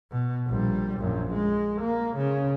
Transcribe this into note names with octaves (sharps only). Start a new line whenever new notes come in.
B2
A#1 G3
A#1 F#2
G#3
A#3
C#3